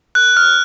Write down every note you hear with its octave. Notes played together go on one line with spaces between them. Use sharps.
F#6
F6